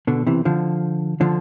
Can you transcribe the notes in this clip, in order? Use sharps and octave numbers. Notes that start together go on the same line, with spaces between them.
B2 D3
C3 E3
D3 F3
D3 F3